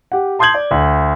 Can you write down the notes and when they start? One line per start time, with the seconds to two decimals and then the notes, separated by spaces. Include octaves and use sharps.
0.12 G4 F#5
0.39 A5 C6 D#6 G6 G#6 F#7
0.54 D5
0.71 D2